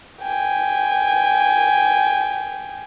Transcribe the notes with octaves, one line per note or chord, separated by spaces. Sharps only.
G5 G#5